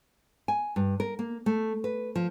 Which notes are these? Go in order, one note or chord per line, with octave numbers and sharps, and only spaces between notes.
G#5
G2
A#4
A#3
A3
B4
F3